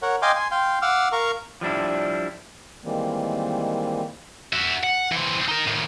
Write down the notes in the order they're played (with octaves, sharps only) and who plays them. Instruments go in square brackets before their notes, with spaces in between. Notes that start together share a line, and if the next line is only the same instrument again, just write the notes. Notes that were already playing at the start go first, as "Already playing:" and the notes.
[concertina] A#4 C#5 F#5
D#5 F5 G5 G#5 C6 D6
G#5 C6
F5 G5 C6
F5 F#5 D6 E6 F6
A#4 F5 A#5 C#6
[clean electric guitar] F3 G3 D4 E4
[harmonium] D#3 E3 G3 G#3 A#3 C4
[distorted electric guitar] F#4 E5
F#5
E3 C4
D#4 A#4
A2 D#3